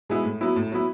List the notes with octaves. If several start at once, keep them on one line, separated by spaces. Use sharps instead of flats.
B2 G#3 B3 E4
A2
F#3 B3 E4
A2
F#3 B3 E4